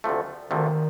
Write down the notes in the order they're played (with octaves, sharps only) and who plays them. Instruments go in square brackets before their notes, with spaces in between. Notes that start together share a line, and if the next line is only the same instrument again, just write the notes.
[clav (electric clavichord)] D2 C3 F3 A3
[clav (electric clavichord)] D2 C3 F3 A3 [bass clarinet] D#3